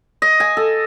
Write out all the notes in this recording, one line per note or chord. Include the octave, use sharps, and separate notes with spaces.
D#5
G#5
A4